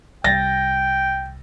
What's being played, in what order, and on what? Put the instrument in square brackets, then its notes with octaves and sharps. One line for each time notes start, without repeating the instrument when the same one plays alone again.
[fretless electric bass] C2 G3 [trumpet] G5 [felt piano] A6 A#6